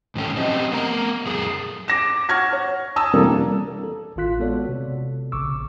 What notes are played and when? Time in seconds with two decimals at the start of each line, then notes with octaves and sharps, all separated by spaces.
0.15 G#2 D#3 C#4 A4
0.37 F3 C4 G4 C5 D#5
0.72 B3 A#4 A#5
1.26 F#2 G#4 A4
1.88 D6 A#6 E7
2.29 F#5 C#6 F6 G#6 A#6
2.53 C#5
2.96 A5 A#5 D#6 E6
3.13 C3 E3 G3 A#3 D4 A4
3.83 A4
4.16 A1 A2 D#3 F4 F#6 B6
4.40 G#3 B3 F#4 A4 C#5 D5
4.69 C3
5.32 A#1 C#3 C#6 D6 E6